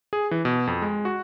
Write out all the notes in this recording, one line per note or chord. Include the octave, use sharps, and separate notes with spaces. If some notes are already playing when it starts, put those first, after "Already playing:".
G#4
E3
B2
F2
G#3
F#4